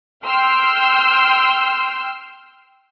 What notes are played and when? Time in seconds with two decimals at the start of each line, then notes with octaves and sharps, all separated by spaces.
0.25 G5 C6 E6 F6 G6